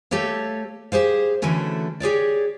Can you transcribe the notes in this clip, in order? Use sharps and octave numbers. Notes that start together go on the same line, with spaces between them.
A3 G4 A4 C#5 F5
G4 G#4 C5 F5
D3 E3 F#3 A3 C#4 E4
G4 G#4 C#5 D5